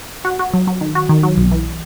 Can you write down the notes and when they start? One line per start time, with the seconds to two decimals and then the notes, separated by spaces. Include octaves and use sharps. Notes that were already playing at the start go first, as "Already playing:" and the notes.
0.25 F#4
0.39 F#4
0.54 F#3
0.67 F#3
0.81 D#3
0.95 F#4
1.09 D#3
1.23 F#3
1.37 B1
1.52 E3